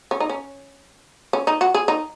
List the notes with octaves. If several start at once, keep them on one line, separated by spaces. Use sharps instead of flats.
C#4
D#4
C#4
C#4
D#4
F#4
G#4
D#4